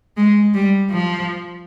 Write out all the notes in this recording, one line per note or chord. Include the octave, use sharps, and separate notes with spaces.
G#3
G3
F3